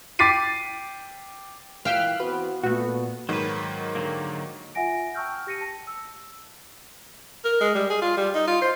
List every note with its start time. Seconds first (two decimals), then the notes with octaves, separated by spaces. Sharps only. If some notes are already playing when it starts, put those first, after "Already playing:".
0.19 G5 D6 A6 B6 C7 D#7
1.85 A#2 E3 E5 F5 G5 F6 F#6
2.20 E3 B3 C4 F#4 B4
2.63 A#2 A3 B3 F#4
3.29 G#2 D#3 F#3 B4
3.95 D3 F#3 A#3
4.75 F4 E5 F#5 G#5 A#6 D7
5.15 G5 A5 C#6 E6 F6 G6
5.47 G4 A#6 C#7 D#7
5.61 A5
5.87 E6
7.45 A#4
7.61 G#3
7.75 G3
7.90 G#4
8.02 F4
8.17 G3
8.35 D#4
8.47 F4
8.62 C5